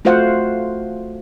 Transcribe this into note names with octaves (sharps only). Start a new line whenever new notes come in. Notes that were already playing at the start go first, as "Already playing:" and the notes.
A3 F4 F#4 C5 F5 F#5